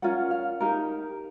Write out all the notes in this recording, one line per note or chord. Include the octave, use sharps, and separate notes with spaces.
C#4 F4 A#4 F#5
F5
D#4 G4 A#4